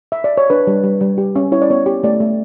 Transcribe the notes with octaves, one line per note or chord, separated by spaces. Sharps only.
E5
D5
C#5
D4 B4
G3
G3
G3
G4
C#4
E4 C#5
D5
B3 C#5
G4
A3 D5
A3